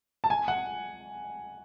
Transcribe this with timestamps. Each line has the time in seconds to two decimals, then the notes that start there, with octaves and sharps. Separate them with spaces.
0.24 A5
0.30 G#5
0.48 F#5